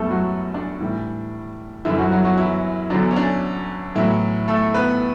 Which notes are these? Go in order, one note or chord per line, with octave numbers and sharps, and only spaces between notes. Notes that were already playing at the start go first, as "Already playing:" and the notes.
Already playing: F#2 E3 G3 A3 B3 A4
F#3 F#4
D4
A2 E3 G3
F#2 D3 E3 G3 E4
F#3 F#4
F#3 F#4
F#3 F#4
E3 E4
E2 D3 F#3 D4
C#4
D4
A2 E3 F#3 E4
A3 A4
B3 B4